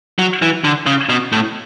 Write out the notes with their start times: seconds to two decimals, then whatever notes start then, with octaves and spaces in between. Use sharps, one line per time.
0.19 F#3
0.42 E3
0.64 D3
0.86 C#3
1.09 B2
1.32 A2